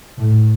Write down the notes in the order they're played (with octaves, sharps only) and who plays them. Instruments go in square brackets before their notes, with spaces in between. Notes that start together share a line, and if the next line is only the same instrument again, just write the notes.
[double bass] A2